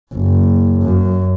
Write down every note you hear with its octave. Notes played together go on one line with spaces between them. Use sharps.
F#1
F#2